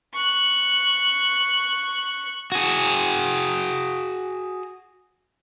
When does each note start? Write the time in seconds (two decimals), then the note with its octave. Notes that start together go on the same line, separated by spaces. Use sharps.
0.13 C#6 F#6
2.52 F#4 G#4